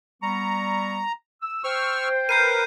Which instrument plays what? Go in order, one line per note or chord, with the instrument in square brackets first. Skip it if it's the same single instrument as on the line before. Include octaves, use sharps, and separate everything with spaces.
[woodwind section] G3 B3 C#6 [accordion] A#5
[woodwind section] E6
[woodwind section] C5 G5 [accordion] C#6 E6 F6
[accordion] A#4 B4 [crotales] G6 C7 D#7